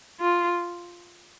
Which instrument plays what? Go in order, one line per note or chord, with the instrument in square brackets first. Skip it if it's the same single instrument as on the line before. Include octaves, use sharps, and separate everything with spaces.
[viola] F4